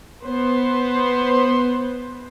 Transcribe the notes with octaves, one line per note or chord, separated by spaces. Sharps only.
B3 B4 C5